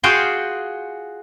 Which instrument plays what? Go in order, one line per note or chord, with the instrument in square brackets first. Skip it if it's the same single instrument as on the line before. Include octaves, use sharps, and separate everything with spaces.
[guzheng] F4 F#4 G#4 F5 G5 C6